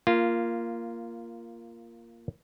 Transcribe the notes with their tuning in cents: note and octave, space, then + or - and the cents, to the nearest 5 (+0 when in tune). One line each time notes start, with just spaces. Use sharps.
A#3 +0 F4 -15